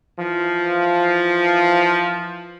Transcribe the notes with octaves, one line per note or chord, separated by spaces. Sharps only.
E3 F3